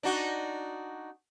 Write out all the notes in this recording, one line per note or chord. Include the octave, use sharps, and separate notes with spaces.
D4 D#4 F#4